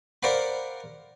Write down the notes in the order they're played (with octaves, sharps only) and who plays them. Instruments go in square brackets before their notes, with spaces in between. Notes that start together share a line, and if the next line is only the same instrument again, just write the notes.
[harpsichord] A#4 C5 D5 F5 F#5 B5